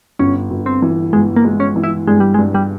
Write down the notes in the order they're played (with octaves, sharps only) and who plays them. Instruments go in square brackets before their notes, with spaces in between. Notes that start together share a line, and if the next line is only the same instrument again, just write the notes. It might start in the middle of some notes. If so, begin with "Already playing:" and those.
[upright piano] G1 [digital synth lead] C#4
[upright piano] G1
[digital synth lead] C4
[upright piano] E3
[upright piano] G1 [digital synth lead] G#3
[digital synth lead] A#3
[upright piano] G#3
[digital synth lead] C#4
[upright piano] E3
[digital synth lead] E4
[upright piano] G2 [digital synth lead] G#3
[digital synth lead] G3
G#3
[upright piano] G2
[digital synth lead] G3